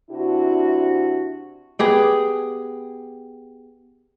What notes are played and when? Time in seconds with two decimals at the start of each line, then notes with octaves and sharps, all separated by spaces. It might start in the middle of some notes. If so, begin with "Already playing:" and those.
0.10 C3 D4 E4 F#4
1.79 B3 G4 G#4 G5